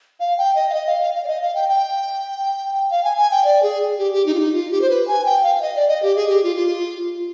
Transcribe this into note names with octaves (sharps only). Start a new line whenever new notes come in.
F5
G5
D#5
F5
D#5
F5
F5
F5
D5
D#5
F5
G5
G5
F5
G#5
G#5
G5
D5
G#4
G4
G4
D#4
F4
D#4
F4
G4
C5
B4
G#5
G5
F5
F5
D#5
D5
D#5
G4
G#4
G4
F4
F4